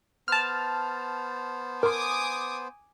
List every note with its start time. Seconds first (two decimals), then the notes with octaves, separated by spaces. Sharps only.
0.28 B3 C5 A5 F6
1.83 A#4 G#5 C6 D6 D#6